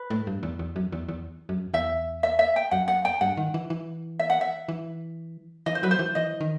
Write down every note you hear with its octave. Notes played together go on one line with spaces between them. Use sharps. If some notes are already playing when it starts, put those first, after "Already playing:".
Already playing: B4
A2
G2
E2
E2
F#2
E2
E2
F#2
E2 E5
E5
E5
G5
F#2 F#5
F#5
G5
G2 F#5
D#3
E3
E3
E5
F#5
E5
E3
E3 D#5
C5
F#3 B4
C5
E3
E3 D#5
D#3